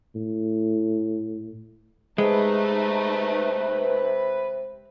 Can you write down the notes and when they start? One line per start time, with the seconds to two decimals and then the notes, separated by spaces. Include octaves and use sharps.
0.15 A2
2.18 C3 G#3 A3 D#4 B4